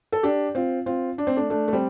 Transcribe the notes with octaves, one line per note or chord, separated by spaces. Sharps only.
A4
D4 G4
C4 F4
C4 F4
D4
C4
A3 D4
A3 D4
A3
G3 C4